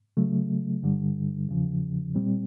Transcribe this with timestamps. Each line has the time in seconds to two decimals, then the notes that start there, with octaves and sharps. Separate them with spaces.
0.17 C#3 F#3 A3
0.83 G2 D3 G3
1.49 E2 C#3 F3
2.15 A#2 G3 C4